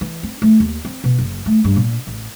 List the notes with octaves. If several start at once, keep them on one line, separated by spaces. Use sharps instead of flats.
E3
C4
A3
D#2
C4
B2
F#1
A3
G2
A#2
A1